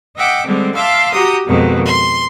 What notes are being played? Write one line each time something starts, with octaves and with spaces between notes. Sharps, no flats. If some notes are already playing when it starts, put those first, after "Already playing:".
D#5 E5 F#5 G5 D6
D3 G3 G#3 C4
E5 F5 A5 C6 D6
F#4 G4 A#5 D#6
F2 B2 D#3 G#3
C6